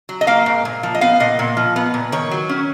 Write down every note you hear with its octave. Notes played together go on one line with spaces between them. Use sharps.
F#3
D#5
A#3 F5
G#2
A#2
F3
D#5
B3 F5
A#2 D#5
A#2
F3
B3
A#2
D#3 C#5
F#3
C#4